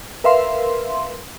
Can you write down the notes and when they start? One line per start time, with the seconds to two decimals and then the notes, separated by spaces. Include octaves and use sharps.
0.24 A#4 B4 E5 F5 C6